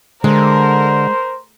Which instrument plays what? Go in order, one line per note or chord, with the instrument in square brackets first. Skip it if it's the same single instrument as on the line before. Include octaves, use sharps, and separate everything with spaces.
[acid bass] D3 [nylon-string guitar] G#3 [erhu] A#4 [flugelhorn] C5